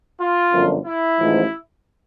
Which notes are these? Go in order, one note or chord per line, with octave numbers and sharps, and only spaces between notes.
F4
G1 F#2 D3 F3
E4
A1 G#2 F3